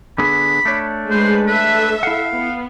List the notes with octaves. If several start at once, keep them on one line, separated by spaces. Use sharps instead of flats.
D3 B3 G#4 B5
A3 D4 C#5
G#3 B4 C5
A4 B4 E5
E4 F5 F#5
B3